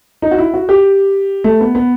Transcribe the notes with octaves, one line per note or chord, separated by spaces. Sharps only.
D#4
F#4
E4
F#4
G4
A3
B3
B3